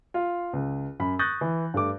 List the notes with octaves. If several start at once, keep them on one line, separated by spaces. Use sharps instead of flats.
F4 F5
C#2
F#2 B5
C#6 D#6 F#6 G6 A6 A#6
E3
G2 A3 D6